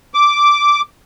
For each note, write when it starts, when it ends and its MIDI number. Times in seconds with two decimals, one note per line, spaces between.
0.14 0.81 86